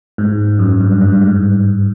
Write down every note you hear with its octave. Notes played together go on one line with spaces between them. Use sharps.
G#2
F#2
G2
G2
G#2